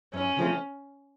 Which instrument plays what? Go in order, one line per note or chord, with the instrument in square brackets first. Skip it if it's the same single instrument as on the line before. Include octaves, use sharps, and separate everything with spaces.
[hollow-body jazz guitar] F#2 [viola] C#4
[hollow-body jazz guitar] C#3 F3 A3 C4